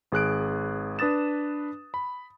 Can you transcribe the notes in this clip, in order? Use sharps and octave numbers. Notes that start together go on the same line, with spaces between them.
G#1 G#4 F#6 D7
D4 B4 D#6 A6 E7
B5